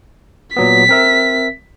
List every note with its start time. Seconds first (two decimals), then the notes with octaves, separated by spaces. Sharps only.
0.57 A#2 F#3 B3 B6
0.89 C4 A#4 E5